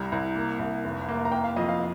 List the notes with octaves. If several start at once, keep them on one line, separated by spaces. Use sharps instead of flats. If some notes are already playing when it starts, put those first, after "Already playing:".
Already playing: C2 G3 A#5
C2
A#3
C2
F1
A#3
A#5
A#3 G5
F5
F2 D#5
F5